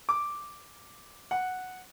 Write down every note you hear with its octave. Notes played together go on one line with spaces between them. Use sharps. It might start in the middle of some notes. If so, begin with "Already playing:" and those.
D6
F#5